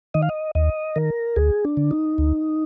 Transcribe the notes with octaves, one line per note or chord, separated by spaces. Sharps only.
D#3 D#5
F5
D#5
D#2 D#5
D#3 A#4
D2 G#4
D4
D3
D#4
D2